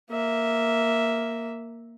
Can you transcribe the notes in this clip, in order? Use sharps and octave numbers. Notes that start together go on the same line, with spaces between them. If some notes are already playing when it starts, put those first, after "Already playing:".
A#3 E5